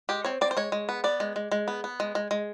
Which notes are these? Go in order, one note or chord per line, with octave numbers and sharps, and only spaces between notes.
G#3 G4
C4 C#5
C4 D5
C5
G#3 C#5
G#3
B3
B3 D5
G#3
G#3
G#3
B3
B3
G#3
G#3
G#3